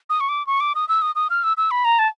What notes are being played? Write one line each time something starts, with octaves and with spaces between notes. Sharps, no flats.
D#6
C#6
D6
C#6
D6
D#6
E6
D#6
D#6
F6
E6
E6
B5
A#5
A5